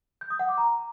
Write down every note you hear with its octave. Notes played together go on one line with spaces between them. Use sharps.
G6
D#6
F#5
D6
A#5